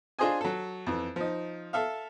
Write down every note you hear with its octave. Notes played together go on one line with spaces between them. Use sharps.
D4 F4 G#4 C5 D#5 G#5
F#3 A4
F2 E3
F3 D#4
A4 E5 F5